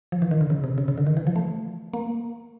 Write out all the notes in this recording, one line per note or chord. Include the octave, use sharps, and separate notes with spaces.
F3
E3
D#3
D3
C#3
C3
C#3
C#3
D3
D#3
E3
F3
A3
A#3